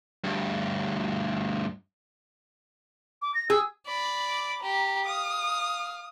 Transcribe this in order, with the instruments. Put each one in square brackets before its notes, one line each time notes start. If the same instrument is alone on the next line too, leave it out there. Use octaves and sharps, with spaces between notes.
[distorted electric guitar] D2 G2
[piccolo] D6
A#6
[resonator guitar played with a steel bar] G#4 [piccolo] E6
[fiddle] D5 B5
[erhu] D6
[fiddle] G4 [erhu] A#5
[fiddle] F5 [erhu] D#6